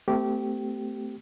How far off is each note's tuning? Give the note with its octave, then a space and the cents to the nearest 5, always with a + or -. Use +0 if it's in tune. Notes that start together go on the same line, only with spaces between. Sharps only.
A3 +5 C4 -40 G4 -15